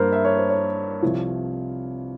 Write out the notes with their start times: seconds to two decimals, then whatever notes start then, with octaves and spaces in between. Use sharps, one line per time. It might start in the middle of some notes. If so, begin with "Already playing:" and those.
Already playing: G2 A#3 A#4 C5
0.12 E5
0.25 C#5
0.38 C5
0.50 C#5
1.03 C2 C3 F3